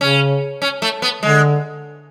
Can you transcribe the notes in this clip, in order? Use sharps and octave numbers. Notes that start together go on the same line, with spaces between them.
C#3 C#4
C#4
A3
B3
D3 G#3